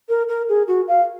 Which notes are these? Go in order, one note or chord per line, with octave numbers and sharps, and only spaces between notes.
A#4
A#4
G#4
F#4
F5